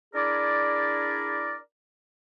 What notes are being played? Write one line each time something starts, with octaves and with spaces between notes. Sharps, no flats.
D4 E4 G#4 A#4 D5